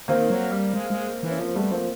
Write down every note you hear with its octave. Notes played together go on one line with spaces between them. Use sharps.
D#3 A#3 C4
F#3
G3
G#3
G#3
E3
C#4
F3 A#3 C4
G3 A3 B3
F3 A#3 C4